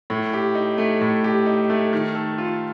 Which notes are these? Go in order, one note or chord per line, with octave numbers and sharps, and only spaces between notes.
A2
G4
D#4
A3
A2
G4
D#4
A3
D#3
A4
F4